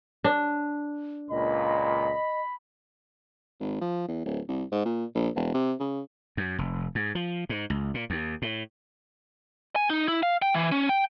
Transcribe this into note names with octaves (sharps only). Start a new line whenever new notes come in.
D4
C#2 A#2 D#5 B5
G#1
F3
E2
D1
C2
G#2
A#2
A#1
E1
C3
C#3
F#2
F1
G#2
F3
G#2
C#2
A#2
D#2
A2
G#5
D#4
E4
F5
G5
E3
C#4
G5